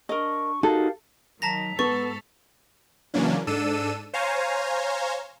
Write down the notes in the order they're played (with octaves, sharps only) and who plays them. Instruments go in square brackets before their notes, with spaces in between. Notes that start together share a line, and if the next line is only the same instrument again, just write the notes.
[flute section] D4 C#6 [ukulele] A#4 D#5
[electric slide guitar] D#4 F#4 [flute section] G4 A#4 F5 [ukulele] A4
[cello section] D#3 F#3 [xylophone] A5 A#5 A#6 [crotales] B6 F7
[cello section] G#2 A4 [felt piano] B3 [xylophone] C#6 [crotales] A6
[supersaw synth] C#3 E3 F#3 A#3 C#4 D4
G#2 D4 A4 E6 D#7
C5 C#5 F5 G#5 A#5